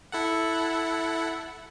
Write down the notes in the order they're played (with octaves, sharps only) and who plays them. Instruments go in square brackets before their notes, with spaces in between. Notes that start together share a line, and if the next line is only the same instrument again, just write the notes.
[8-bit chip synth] E4 A4 F#5